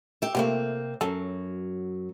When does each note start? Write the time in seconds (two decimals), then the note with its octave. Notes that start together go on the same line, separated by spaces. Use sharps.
0.22 G4 E5
0.35 C3 A3 A#3 C4 F4 G4
1.01 F#2 F#3 A4